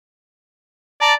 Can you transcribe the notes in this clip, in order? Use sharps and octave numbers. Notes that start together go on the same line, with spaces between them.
D5 A5 A#5